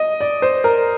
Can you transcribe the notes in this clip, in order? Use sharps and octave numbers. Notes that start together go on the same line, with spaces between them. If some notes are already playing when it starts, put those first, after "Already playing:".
Already playing: D#5
D5
C5
A#4